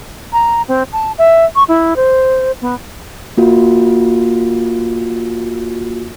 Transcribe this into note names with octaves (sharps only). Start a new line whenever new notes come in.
A#5
C4
A5
E5
C#6
E4
C5
B3
A#3 F4 F#4